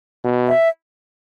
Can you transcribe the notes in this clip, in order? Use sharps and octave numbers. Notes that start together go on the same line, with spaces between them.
B2
E5